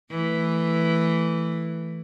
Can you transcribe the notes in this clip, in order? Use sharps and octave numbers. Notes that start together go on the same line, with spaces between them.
E3 A3